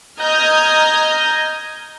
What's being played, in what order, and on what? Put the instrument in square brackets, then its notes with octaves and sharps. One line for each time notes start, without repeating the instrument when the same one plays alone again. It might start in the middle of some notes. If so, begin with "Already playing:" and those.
[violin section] D#5 A#5 D#6 F6 G6 G#6